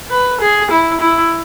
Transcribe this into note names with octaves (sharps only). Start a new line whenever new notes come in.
B4
G#4
E4
E4